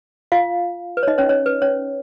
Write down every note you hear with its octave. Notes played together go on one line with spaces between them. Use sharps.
F4 F5
B4
C#5
D#4 D#5
C#4 C#5
C#4 C#5
B4
C#4 C#5